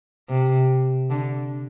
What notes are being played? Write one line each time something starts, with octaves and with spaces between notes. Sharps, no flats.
C3
D3